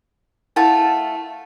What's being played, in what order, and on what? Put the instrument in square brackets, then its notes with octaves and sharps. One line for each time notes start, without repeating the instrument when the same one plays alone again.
[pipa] A3 F4 A5 [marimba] E4 F#5 A6